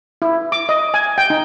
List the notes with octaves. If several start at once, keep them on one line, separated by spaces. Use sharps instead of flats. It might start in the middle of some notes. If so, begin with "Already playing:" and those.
E4
D6
D#5
G#5
G5
D#4